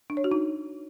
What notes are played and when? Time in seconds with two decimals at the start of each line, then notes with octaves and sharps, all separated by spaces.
0.10 D4
0.17 C#5
0.24 F#4
0.32 D#4